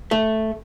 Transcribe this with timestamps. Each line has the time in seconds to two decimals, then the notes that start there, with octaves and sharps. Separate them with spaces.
0.11 A3